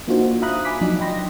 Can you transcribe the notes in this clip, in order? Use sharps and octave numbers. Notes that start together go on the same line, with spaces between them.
A#3 D4 D#4 F4 F#4 C5
E5 F5 A#5 B5 D#6 F#6
G#5 B5 D6 B6
F3 F#3 D4 D#4
D#5 G5 B5 C6 A#6